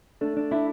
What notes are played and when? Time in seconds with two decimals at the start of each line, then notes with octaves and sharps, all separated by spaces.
0.21 A3 D4
0.37 D4
0.51 D4 E4